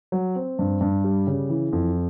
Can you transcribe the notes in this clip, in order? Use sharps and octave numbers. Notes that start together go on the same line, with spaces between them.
F#3
C4
G2
G2
G3
C#3
E3
F2